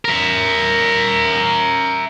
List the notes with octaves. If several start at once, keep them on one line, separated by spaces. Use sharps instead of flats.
A#4 E5